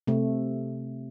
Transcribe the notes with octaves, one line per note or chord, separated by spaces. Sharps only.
C3 A3